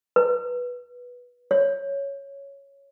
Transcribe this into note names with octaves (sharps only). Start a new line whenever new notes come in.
B4
C#5